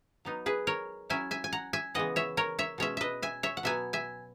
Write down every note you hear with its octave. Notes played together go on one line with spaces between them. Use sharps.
F#3 B3 D#4
G#4 B4
A#4 C#5
F#3 C#4 E4 E5 G#5
E5 G#5
G#5
F#5 A#5
E5 G#5
C#3 E3 G#3 B3 D#5 F#5
C#5 E5
A#4 C#5
C#5 E5
B2 G#3 C#4 C#5 E5
B4 D#5 E5
E5 G#5
C#5 E5
F#5
B2 F#3 B3 E5 G#5
E5 G#5